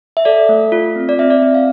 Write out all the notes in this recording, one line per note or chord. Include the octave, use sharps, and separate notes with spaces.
E5
A4 D5
A3
F4
C4
D5
C4 E5
D5
C4
F5